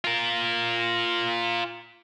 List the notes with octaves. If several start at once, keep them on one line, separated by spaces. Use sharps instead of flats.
F4 A#4